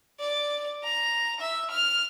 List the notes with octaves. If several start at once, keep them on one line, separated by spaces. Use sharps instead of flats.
D5
A#5
E5
F6